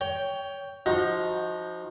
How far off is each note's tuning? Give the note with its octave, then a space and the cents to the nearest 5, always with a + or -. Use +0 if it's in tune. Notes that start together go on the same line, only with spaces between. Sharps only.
C#5 +20 G5 +0
F3 +0 D#4 +15 F#4 -20